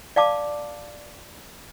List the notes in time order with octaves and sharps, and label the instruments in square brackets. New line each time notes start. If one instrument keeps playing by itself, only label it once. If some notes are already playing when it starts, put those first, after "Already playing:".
[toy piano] D5 F5 A5 D6